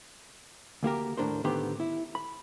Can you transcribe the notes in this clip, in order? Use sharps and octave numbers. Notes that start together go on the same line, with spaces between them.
D2 A#3 G4 A#4
D#2 A2 F3 D4 A#4 C5
A2 D3 D#3 B3 G4 C5
E4
B5